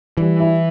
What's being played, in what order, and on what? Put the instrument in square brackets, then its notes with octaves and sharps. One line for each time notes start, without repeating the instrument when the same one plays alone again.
[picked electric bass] E3 [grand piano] G3
[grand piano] E4